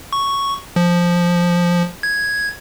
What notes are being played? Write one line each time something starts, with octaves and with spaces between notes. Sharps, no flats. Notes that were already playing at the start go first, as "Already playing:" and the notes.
C#6
F3
G#6